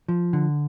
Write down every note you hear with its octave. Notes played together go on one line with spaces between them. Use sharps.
F3
D3